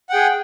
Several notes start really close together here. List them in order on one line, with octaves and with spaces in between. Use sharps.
F#5 G5 G#4